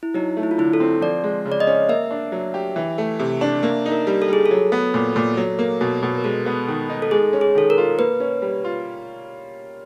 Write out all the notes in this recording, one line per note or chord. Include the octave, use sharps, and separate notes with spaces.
E4
F#3 D#4
A3
E4
F4
D3 E4
A4
C4
F3 D5
G#3
C#3
D5
D#5
C#4
A#3 E5
D4
F#3
G4
E3
A3
C3
D4
A#3 E5
D#4
A#4
G3
A4
G3 G#4
A4
F#3
B3
A#2
A#2
F#3
A#3
B2
B2
A#4
G#3 A4
B3
D#3
D#4
A4
G#3 G#4
C#4
G#4
D#3 A4
A#4
F4
A#3 B4
C#4
G3
F4